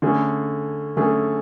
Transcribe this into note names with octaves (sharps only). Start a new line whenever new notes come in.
D3 A3 C#4 G#4
D3 A3 C#4 G#4